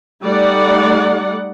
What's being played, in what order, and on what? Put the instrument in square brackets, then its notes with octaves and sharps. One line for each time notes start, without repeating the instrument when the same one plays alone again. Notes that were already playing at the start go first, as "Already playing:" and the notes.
[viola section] G3 A3 D#4 D5 F#5